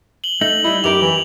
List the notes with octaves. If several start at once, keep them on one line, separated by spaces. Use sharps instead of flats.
F#7 G7
A3 D#4 F#7
G3 D#4 E4
F#2 G4 A#4 F7
E3